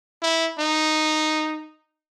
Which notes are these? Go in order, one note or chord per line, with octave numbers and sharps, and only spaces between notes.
E4
D#4